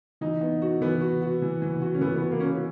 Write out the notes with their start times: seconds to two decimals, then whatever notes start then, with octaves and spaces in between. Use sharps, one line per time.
0.21 E3 D#4
0.41 B3
0.62 F#4
0.81 E3 B3
1.01 F#4
1.22 F#4
1.42 E3
1.62 E3
1.81 F#4
1.95 C#4
2.01 E3 B3
2.16 B3
2.21 F#4
2.32 A#3
2.40 C#4 F#4
2.47 B3